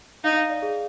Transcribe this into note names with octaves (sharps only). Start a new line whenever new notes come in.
D#4 F5
F5
D5
G#4